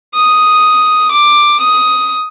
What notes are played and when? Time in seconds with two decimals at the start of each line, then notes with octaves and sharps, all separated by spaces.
0.15 D#6
1.12 D6
1.61 D#6